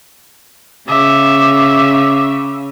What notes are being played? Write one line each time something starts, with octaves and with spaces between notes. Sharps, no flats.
C#3 E5 D6